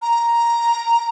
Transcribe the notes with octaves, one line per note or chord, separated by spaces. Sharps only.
A#5